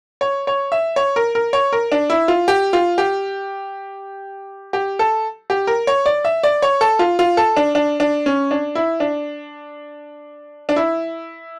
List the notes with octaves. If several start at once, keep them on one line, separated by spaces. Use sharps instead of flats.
C#5
C#5
E5
C#5
A#4
A#4
C#5
A#4
D4
E4
F4
G4
F4
G4
G4
A4
G4
A#4
C#5
D5
E5
D5
C#5
A4
F4
F4
A4
D4
D4
D4
C#4
D4
E4
D4
D4
E4